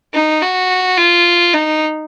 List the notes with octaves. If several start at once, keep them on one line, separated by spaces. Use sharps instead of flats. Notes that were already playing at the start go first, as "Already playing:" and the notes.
D#4
F#4
F4
D#4